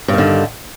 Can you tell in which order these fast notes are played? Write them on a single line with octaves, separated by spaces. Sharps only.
G2 D#3 D3